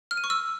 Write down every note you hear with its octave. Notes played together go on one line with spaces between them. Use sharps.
F6
D#7
C#6
E6